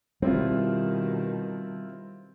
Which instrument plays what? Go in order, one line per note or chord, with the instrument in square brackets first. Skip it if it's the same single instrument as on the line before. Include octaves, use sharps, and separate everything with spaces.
[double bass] B2 D#3 [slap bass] G3 [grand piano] C4 E4 F4